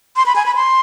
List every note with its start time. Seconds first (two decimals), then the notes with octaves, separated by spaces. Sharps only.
0.16 C6
0.26 B5
0.36 G#5
0.46 B5
0.55 C6